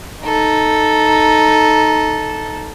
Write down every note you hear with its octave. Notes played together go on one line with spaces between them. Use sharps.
D#4 A4